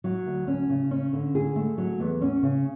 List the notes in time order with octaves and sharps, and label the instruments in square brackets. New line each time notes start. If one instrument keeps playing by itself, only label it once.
[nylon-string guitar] F#3
D2
C#4
C#3
C#4
D3
G#4
A3
F#3
E2
C#4
C#3